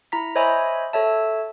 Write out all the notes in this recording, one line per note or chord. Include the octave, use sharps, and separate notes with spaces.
E4 A#5 B6
C5 C#5 D#5 E5 G#5 B5
A4 C#5 E5 A5